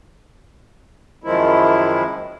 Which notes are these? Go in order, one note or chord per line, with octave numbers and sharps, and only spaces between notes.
F#2 D#3 F3 G#3 E4